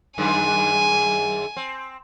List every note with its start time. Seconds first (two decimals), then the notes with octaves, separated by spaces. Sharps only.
0.18 F#2 D#3 G#3 G#5
1.57 C4